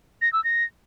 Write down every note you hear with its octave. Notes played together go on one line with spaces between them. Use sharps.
A#6
E6
A#6